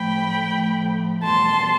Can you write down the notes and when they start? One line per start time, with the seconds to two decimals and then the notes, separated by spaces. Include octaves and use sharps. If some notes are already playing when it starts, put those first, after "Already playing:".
Already playing: A2 F3 A3 G5 B5
0.50 A2 F3 A3
1.24 E2 B2 G3 A5 C6